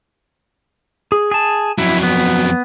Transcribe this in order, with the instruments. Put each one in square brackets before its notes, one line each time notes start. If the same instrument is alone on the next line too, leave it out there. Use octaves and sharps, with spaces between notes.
[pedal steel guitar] G#4
G#4 A5
[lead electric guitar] F2 F#3 [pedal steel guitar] E4
[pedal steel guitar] B3